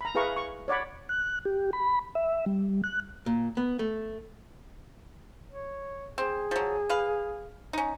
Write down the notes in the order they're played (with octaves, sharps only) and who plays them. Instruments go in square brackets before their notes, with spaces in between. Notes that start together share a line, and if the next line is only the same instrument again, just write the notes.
[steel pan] A#5 B5
E4 G#4 B4 F5 A#5 C#6
C#6
C#5 D5 F#5 B5
[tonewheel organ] F#6
G4
B5
E5
G3
F#6
[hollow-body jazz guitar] A#2
B3
A3
[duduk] C#5
[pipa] C4 [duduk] G#4
[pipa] F3 F#3
B4 F5
C#4 D#4